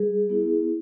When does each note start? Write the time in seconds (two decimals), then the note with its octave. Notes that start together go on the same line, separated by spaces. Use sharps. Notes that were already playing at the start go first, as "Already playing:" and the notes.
Already playing: G3 G#4
0.30 B3 E4